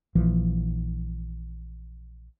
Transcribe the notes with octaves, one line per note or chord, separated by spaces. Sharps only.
A#1 E3 F3